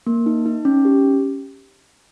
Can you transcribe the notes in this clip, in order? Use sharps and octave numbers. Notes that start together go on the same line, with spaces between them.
A#3
D#4
D#4
C#4
G4